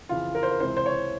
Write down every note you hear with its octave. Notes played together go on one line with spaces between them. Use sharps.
F2 C#3 E3 F4
A#4
C5
A#4
C#2 C3 E3 C5
C5
C#5